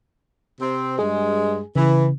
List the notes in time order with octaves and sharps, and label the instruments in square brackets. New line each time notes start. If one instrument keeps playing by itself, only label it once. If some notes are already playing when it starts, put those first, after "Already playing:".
[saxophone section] C3 C4
[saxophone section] G2 G#3 [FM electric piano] G#4
[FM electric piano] C#3 [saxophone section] E3